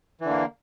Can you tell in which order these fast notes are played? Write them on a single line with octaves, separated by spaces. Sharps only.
E3 D3 A#3